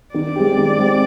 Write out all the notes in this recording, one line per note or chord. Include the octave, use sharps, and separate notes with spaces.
D#3 D5
G#3 C4 G4
D#3
G#3 C4 G4